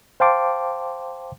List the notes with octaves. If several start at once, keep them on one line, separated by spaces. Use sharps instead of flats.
C5 F5 G5 A5 C6 D6